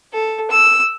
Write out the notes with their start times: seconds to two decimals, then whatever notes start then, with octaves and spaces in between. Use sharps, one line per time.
0.13 A4
0.51 E6